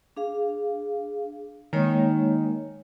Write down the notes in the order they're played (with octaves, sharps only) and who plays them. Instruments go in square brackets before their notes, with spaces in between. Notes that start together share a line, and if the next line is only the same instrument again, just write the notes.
[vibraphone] D4 G#4 F5
[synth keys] D#3 [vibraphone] G#3 A#3 C#5